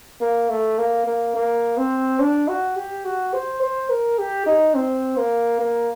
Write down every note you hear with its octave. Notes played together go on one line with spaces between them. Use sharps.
A#3
A3
A#3
A#3
A#3
C4
D4
F#4
G4
F#4
C5
C5
A#4
G4
D#4
C4
A#3
A#3